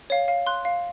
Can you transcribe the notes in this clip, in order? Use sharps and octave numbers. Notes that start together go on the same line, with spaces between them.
C#5 F5
F5
C6 F#6
F5